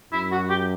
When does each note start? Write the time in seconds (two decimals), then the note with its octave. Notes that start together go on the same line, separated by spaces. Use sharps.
0.12 F#2 E4
0.32 F#4
0.50 G4